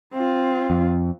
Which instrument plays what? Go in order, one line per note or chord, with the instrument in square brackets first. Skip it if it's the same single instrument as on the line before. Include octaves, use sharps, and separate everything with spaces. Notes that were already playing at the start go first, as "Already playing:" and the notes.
[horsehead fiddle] C4 F4
[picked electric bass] F2